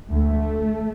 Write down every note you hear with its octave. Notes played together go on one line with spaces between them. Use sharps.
D2 A3